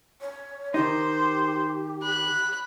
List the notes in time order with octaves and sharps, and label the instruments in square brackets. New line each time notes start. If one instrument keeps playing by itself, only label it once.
[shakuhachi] C#5
[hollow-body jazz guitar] D#3 D#4 [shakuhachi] G4 [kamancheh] C5
[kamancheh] B5 [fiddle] F#6